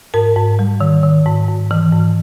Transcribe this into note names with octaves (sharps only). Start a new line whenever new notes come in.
G#2 A#4
G#2
G3
D#3
D#3
G#2
G#2
E3
G#2